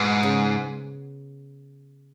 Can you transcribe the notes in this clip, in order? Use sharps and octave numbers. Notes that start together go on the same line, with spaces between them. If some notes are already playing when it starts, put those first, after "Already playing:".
Already playing: G#2 B2 B3
C#3